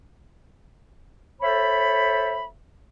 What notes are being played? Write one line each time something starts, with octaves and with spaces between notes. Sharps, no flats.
A4 C5 C#5 E5 B5